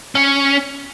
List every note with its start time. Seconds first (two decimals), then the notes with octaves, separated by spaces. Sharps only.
0.15 C#4